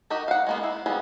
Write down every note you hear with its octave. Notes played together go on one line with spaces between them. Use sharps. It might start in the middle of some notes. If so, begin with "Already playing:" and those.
D#4 F#4 G4 A#4 D#5
F5 F#5
G#3 A#3 B3
E4
F3 G3 B3 G#4